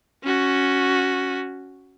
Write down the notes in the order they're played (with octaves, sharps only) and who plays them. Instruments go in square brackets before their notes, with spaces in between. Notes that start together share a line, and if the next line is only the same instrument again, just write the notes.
[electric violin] C#4 F#4